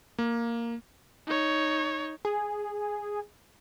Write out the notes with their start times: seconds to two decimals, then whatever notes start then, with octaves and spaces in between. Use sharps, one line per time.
0.19 A#3
1.27 D#4 C#5
2.25 G#4